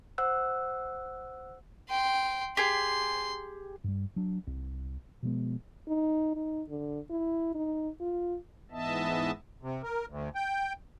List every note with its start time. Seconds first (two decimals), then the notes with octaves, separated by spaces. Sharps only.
0.18 C5 F#5 E6 F#6
1.89 G5 C6
2.57 G4 G#4 C6
3.84 G2 G3
4.16 F#3 D4
4.47 C2
5.23 B2 F3 G#3 B3
5.88 D#4
6.35 D#4
6.69 D3
7.10 E4
7.55 D#4
8.01 F4
8.71 G#2 E3 B3 D#5 E5 A5
9.62 C3
9.83 A#4
10.09 D2
10.35 G5